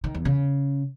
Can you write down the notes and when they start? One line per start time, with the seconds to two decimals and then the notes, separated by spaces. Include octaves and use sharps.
0.04 D#3
0.14 E2
0.25 C#3